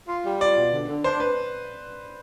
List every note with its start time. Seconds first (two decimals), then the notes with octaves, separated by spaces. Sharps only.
0.08 F4
0.24 G3
0.41 F4 D5
0.57 B2
0.73 D3
0.88 D3
1.04 D4 C5
1.20 B4